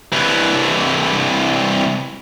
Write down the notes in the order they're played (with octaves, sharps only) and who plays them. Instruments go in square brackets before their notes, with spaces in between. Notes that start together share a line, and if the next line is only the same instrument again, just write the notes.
[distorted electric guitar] C2 E3